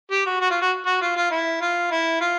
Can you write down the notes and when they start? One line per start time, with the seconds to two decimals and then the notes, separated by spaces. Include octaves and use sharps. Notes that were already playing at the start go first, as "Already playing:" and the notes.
0.11 G4
0.26 F#4
0.41 F#4
0.50 F4
0.61 F#4
0.86 F#4
1.01 F4
1.16 F4
1.31 E4
1.61 F4
1.91 E4
2.20 F4